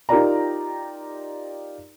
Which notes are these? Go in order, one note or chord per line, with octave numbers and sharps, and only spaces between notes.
D#4 F4 G4 A#4 D5 A#5